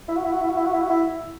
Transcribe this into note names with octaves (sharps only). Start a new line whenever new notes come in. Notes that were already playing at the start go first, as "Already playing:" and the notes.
E4
F#4
E4
F#4
E4
F#4
E4
F#4
E4
F#4
E4